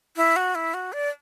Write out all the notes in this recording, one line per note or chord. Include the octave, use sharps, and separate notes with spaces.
E4
F#4
E4
F#4
D5